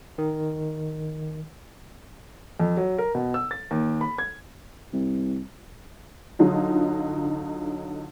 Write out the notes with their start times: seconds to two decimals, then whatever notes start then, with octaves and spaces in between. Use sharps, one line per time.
0.18 D#3
2.60 F2
2.77 F#3
2.98 A#4
3.15 B2
3.34 E6
3.51 A6
3.71 D#2
4.01 B5
4.18 G#6
4.93 C2
6.39 D3 F#3 D#4 F4